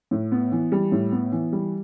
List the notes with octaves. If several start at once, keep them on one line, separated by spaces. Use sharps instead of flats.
A2
B3
E3
G3
A2
B3
E3
G3